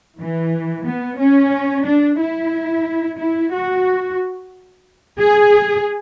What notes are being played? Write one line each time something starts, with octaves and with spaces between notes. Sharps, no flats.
E3
B3
C#4
D4
E4
E4
F#4
G#4